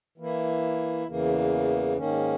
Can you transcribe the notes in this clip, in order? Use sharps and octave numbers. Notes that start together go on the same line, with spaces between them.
E3 A#3 E4
E2 C#3 E3 A#3
G#2 D#3 A#3 C#4